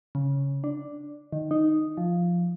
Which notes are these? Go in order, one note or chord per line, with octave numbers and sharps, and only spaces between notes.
C#3
D4
D#3
D#4
F3